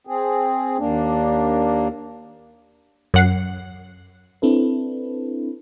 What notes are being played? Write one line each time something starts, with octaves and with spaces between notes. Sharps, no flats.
C4 G#4
D#2 A#3 D4
F#2 F#5 C7
C4 D4 E4 A4 B4